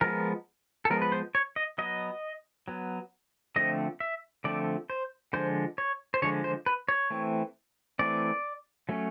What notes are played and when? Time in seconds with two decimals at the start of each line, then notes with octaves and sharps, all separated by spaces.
0.01 F3 G#3 B3 A#4
0.85 A4
0.90 F3 G#3 B3 A#4
1.02 B4
1.12 C5
1.35 C#5
1.56 D#5
1.78 F#3 B3 D#5
2.68 F#3 B3
3.56 D3 F3 A3 C4 D#5
4.00 E5
4.44 D3 F3 A3 C4 D5
4.90 C5
5.33 D3 F3 G#3 C5
5.78 C#5
6.14 C5
6.22 D3 F3 G#3 C#5
6.44 C5
6.66 B4
6.89 C#5
7.10 E3 A3 C4
7.99 E3 A3 C4 D5
8.89 F#3 A3 C#4